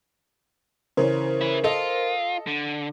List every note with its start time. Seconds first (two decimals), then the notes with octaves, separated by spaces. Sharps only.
0.97 C#3 E3 C#4 A#4 C5
1.41 E4 B4
1.64 F4 A4 D#5
2.47 D3